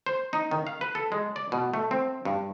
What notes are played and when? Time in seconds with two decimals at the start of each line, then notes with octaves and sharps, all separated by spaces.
0.06 C5
0.33 D#4
0.51 D#3
0.67 F5
0.81 B4
0.95 A4
1.12 G#3
1.36 D5
1.52 B2
1.74 A3
1.91 C4
2.25 G2